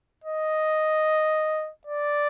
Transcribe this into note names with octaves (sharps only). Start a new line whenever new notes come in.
D#5
D5